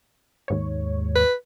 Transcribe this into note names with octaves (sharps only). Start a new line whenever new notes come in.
D#2 G#2 C#5
B4